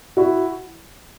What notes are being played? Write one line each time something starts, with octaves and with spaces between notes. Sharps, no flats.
E4 F#4